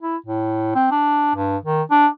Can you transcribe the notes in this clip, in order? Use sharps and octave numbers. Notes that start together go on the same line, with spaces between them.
E4
A2
C4
D4
G2
D#3
D4